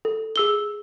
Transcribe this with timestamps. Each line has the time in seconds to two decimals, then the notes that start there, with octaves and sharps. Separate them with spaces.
0.05 A4
0.36 G#4 E6 G7